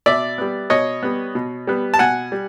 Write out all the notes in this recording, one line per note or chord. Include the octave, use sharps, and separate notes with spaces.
B2 D5 E5
G3 B3
B2 C#5 D#5
G3 B3
B2
G3 B3
A5
B2 F#5 G#5
G3